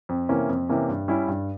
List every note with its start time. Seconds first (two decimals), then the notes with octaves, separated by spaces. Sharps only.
0.09 F2
0.29 C3 E3 A#3 C#4
0.49 F2
0.69 C3 E3 A#3 C#4
0.89 G2
1.08 G3 C#4 E4
1.28 G2